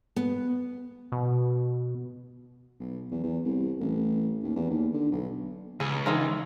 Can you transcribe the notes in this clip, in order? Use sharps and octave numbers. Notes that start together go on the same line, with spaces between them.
B3
B2
B1
E2
E2
C2
A1
D#2
E2
D#2
D3
B1
C#2 G#4
D#3 E3 G#3